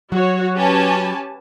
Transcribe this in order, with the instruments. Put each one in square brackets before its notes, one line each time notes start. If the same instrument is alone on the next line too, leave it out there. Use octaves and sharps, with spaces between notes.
[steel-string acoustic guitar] F#3 [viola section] F#4 C#5
[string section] C#4 B4 [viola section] G4 G#5 A5